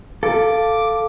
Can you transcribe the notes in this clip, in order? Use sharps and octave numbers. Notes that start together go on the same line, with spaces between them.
A4 F5 D6